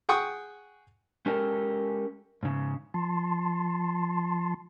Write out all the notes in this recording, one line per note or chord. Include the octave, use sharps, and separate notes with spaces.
G#4 F#5 G5 C#6 D#6
G#3 C#4 G4 A4 A#4
G#2 C#3
F3 A5 C6